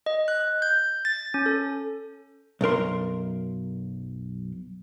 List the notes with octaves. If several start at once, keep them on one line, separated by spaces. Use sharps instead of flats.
D#5
F#6
G6
A6
C#4
A4
B1 F#2 A#4 C6